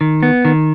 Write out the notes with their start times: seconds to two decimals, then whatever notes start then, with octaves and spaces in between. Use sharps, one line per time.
0.01 D#3
0.23 B3
0.45 D#3